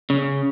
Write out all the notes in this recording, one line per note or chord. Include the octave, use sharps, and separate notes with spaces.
C#3